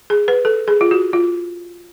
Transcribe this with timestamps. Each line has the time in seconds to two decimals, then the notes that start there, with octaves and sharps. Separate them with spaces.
0.10 G#4
0.28 B4
0.45 A4
0.68 G#4
0.81 F4
0.91 F#4
1.13 F4